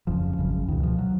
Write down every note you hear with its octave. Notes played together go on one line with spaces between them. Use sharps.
F1 F2 C#3 F3
G#1 F#2 C#3
C#2 B2 D#3
F3
F#3